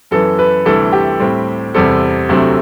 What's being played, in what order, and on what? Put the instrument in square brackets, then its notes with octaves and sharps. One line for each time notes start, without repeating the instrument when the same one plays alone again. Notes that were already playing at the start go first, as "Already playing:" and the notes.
[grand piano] F#2 E3 B3 A4
B4
D2 C3 E3 G3 A4
G4
A2 G3 C4
E2 C3 G3 C4 A4
D2 C3 F#3 A3 C4